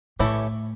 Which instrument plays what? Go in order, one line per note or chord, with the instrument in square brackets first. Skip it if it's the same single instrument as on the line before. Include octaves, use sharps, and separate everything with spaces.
[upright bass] A2 [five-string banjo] E3 A3 E4 G4 C#5